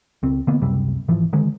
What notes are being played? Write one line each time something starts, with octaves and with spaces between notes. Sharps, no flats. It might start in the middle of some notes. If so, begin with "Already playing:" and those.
C#2 C4
D3 A#3 B3
C#2 F#2 C3 G3
G#1 E3 F3
D3 D#3 G#3